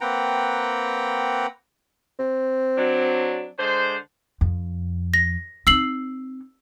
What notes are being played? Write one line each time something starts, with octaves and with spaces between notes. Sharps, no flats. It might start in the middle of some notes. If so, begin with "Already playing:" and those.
A#3 C4 B4 F#5 G5 A#5
C4
F#3 D4
D3 G#3 C5
F2
A#6
C4 D#4 E6 C7 F#7